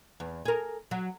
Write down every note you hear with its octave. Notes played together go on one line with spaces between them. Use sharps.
E2
G#4 A#4
F#3